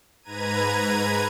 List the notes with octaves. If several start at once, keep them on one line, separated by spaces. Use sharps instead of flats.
G#2 B4 A#5 G#6 D#7